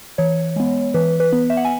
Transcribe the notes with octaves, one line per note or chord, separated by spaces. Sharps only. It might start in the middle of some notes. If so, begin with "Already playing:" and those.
E3 C#5
G#3 B3
E3 B4
B4
B3
E5
F#5
G#5